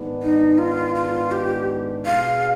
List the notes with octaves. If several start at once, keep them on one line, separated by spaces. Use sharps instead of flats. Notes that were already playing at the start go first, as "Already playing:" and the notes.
Already playing: G#2 D#3 G#3 B3 D4
D#4
F4
F4
G4
B2 B3 D4 G#4 F5